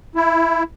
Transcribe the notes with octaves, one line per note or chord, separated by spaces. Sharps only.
E4